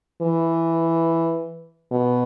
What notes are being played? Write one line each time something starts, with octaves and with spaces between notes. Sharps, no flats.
E3
B2